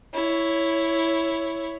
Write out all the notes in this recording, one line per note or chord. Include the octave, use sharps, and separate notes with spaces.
E4 C#5